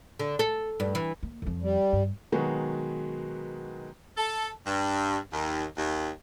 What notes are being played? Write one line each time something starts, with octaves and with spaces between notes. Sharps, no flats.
D3
A4
G2
E3
A#3
F2 F3
G3
G2
B2 D#3 F#3 G#3 F#4 B4
A4
G2
D#2
D#2